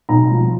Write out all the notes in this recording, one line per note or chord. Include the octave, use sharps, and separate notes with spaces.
B1 A#5
F3